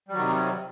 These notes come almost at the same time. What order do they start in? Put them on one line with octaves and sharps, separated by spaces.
G3 F#3 D#3 C3